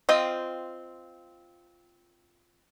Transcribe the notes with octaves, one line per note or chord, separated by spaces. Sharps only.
C4 F4 D#5 F5 G5